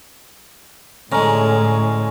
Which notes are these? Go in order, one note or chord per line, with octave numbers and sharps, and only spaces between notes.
A2 D3 G#3 C#4 A#5